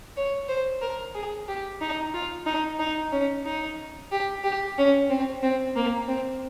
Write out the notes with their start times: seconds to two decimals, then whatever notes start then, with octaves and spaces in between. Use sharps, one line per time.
0.17 C#5
0.48 C5
0.81 A#4
1.14 G#4
1.48 G4
1.81 D#4
2.14 F4
2.46 D#4
2.79 D#4
3.12 C#4
3.45 D#4
4.12 G4
4.44 G4
4.78 C#4
5.10 C4
5.43 C4
5.76 A#3
6.08 C4